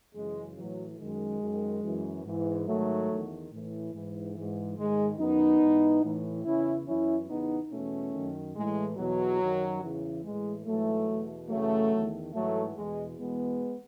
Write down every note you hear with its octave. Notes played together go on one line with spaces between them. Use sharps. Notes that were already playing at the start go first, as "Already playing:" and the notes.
F#2 C#3 E3 G#3
A2 E3 F#3
F#2 D#3 G#3
F#2 D#3
F#2 E3
G#2 E3
G#2 D#3 F#3 A3
E2 D#3
A2 E3
G#2 E3
G#2 E3
G#2 D#3 G#3
F#2 D#3 B3 D#4
G#2 E3
A2 E3
E2 C#3 E3 C#4 E4
F#2 E3 C#4 E4
E2 C#3 E3 B3 D#4
E2 B2 A3 C#4
F#2 D#3
A2 E3 G#3
E2 B2 F#3
F#2 D#3
E2 C#3 E3
A2 E3 G#3
G#2 E3 F#3 A3
E2 B2
F#2 C#3 E3 F#3 A3
E2 D#3
G#2 E3 F#3 A3
E2 B2 G#3
E2 B2 G#3 B3